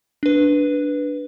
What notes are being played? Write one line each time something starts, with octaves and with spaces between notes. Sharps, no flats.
D4 B4